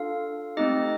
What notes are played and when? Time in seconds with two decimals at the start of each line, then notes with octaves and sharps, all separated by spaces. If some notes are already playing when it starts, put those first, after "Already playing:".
Already playing: D4 F4 A4 F5
0.57 A3 C4 D#4 G4 D#5